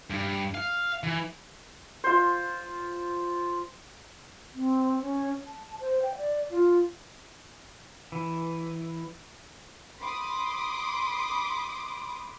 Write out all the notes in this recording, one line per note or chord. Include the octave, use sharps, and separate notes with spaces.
G2
F5
E3
F4 C5
C4
C#4
A5
C5
G5
D5
F4
E3
B5 C6 D6 D#6